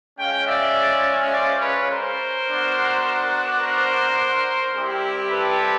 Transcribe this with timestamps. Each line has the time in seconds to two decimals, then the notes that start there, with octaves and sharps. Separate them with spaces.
0.19 G#3 C#4 F4 F5 G5
0.47 D5 E5
1.33 C5 D5
1.61 B4 C#5
1.90 A#4 C5
2.47 B3 D4 F#4
3.61 A#4 C5
4.74 G3 C4 E4 G4
5.30 A4 B4